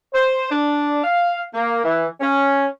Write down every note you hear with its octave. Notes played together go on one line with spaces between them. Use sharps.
C5
D4
F5
A#3
E3
C#4